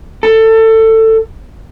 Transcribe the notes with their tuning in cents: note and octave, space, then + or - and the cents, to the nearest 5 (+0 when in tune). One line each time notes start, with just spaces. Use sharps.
A4 +20